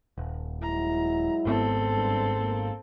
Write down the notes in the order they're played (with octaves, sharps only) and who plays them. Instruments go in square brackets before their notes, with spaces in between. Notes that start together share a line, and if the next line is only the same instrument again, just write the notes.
[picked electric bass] D#1
[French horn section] F#3 G#3 E4 [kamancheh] A#5
[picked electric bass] G#1 G#2 B3 [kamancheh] C4 A4
[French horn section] G2
A#3